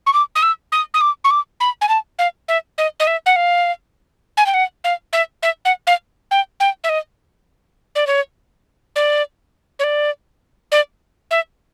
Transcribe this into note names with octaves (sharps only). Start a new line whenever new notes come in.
C#6
D6
D#6
E6
D#6
D#6
D6
C#6
D6
B5
G#5
A5
F5
E5
D#5
D#5
E5
F#5
F5
G#5
G5
F#5
F5
E5
E5
F#5
F5
G5
G5
E5
D#5
D5
C#5
D5
C#5
D5
D5
E5